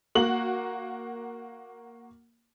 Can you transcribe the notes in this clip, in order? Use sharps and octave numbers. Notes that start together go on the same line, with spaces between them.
A#3 F#4 F#7